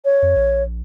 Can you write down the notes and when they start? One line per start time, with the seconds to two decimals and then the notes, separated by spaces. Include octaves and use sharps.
0.05 C#5
0.22 F2
0.36 A#1